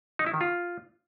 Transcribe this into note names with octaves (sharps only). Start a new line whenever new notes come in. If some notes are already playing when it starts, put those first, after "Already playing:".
D#4
E4
D#3
F4